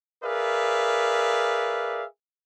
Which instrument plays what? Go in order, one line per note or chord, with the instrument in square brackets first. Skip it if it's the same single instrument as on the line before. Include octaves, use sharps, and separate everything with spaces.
[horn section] G#4 A#4 B4 D5 E5 F5